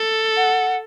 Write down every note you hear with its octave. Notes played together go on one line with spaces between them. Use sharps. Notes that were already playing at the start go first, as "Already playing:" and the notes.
Already playing: A4
F#5